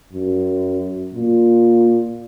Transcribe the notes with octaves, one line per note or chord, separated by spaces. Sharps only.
F#2
A#2